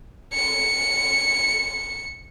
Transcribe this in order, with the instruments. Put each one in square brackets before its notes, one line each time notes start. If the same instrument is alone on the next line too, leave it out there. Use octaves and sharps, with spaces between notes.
[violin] C#7